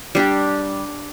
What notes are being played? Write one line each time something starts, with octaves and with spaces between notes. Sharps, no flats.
G3 D4 G4